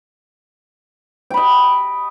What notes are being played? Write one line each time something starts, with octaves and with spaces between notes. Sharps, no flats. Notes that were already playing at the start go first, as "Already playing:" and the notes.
D#5 G5 B5